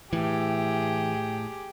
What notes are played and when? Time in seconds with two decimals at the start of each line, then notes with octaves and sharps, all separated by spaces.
0.13 A2 E3 G4 G#4